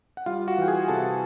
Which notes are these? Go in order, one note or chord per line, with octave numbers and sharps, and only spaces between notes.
F#5
G3 F4 F5
F#4 F#5
E3 G5
G#4 G#5
C3 A4 A5